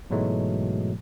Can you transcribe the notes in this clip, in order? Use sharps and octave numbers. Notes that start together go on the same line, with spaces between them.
G#2 B2 E3 F#3 G#3 A3